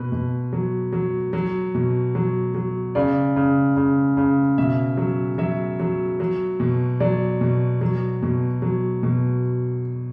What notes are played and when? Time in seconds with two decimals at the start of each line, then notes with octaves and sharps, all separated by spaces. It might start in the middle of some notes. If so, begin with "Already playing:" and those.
Already playing: B2 B4
0.12 B2
0.53 F#3
0.92 F#3
1.33 F#3
1.75 B2
2.15 F#3
2.55 F#3
2.95 C#3 D5
3.36 C#3
3.77 C#3
4.17 C#3
4.58 B2 E5
4.97 F#3
5.38 F#3 E5
5.80 F#3
6.20 F#3
6.60 B2
7.00 F#3 D5
7.41 B2
7.81 F#3
8.23 B2
8.62 F#3
9.03 B2